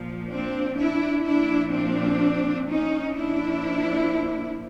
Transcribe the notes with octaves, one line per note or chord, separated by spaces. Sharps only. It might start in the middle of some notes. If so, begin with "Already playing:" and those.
Already playing: A#2 F3
C4 D4
D4 E4
A#2 F3 D4 E4
C4 D4
C#4 D#4
A#2 F3 D4 E4